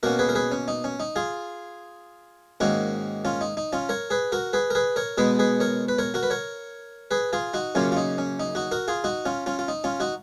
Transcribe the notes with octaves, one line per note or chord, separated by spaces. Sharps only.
B2 A#3 C#4 F#4 A#4
G#4 B4
A#4
G#4 B4
C#4
D#4
C#4
D#4
F4 G#4
G#2 D#3 A#3 C#4 D#4 F#4
C#4 F4
D#4
D#4
C#4 F4
A#4 C#5
G#4 B4
F#4 A#4
G#4 B4
A#4
G#4 B4
A#4 C#5
B2 G#3 B3 G#4 B4
G#4 B4
A#4 C#5
B4
A#4 C#5
F#4 A#4
B4
A#4 C#5
G#4 B4
F4 G#4
D#4 F#4
F#2 C#3 F#3 A#3 C#4 F4
F4
D#4
C#4
D#4
D#4 F#4
F#4 A#4
F4 G#4
D#4 F#4
C#4 F4
C#4 F4
F4
D#4
C#4 F4
D#4 F#4